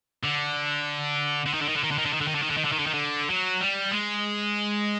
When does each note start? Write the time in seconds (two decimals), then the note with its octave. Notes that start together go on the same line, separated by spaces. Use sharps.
0.24 D3
1.46 D3
1.54 D#3
1.61 D3
1.69 D#3
1.76 D3
1.84 D#3
1.91 D3
1.98 D#3
2.05 D3
2.13 D#3
2.20 D3
2.27 D#3
2.35 D3
2.42 D#3
2.50 D3
2.57 D#3
2.65 D3
2.72 D#3
2.79 D3
2.87 D#3
2.94 D3
3.30 F#3
3.61 G3
3.91 G#3